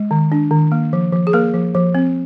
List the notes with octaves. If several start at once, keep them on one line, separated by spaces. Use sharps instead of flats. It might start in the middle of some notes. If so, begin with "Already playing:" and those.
Already playing: G#3
D#3
D4
D#3
A#3
F3
F3
G#4
A#3 A#4
F3
F3
C4